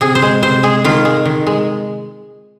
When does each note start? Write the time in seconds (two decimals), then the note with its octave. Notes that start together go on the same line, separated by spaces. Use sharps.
0.01 C3 G#4
0.15 C5
0.22 G#3
0.42 C3 C5
0.63 G#3 G#4
0.84 D#3 F4
1.05 G#3
1.25 D#3
1.47 G#3